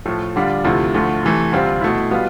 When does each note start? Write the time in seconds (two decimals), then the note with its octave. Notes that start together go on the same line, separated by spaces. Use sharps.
0.06 A2 F3 A3
0.36 D3 G3 D4 F4
0.64 D2 C3 F3 A3 E4
0.94 D2 D3 F3 A3
1.23 C3 E3 A3
1.52 D2 C3 G3 C4 F4
1.81 B2 A3 E4
2.11 B2 G3 B3 F4